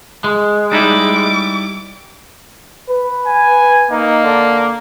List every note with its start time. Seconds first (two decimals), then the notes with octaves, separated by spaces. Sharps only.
0.24 G#3
0.72 G3 D#4 E4 D6
2.89 B4
3.26 G#5
3.91 A#3 D#4
4.23 D3